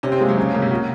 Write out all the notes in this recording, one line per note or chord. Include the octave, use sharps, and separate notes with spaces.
C3 C#4
C4
G#3 A#3
F#3
C#3 C#4
C#3 A#3
C3
C#3 F#4